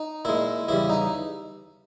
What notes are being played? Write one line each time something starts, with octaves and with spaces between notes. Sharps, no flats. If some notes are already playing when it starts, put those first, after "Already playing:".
Already playing: D#4
A#2 G#3 E4
E2 C#3 G3 E4
D#4